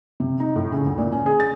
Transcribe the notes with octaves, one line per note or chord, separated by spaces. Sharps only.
C3
D#4
A2
C#3
D2
A#2
C#4
G#4
A6